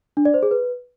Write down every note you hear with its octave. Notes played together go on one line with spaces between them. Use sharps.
D4
D5
C5
G#4
B4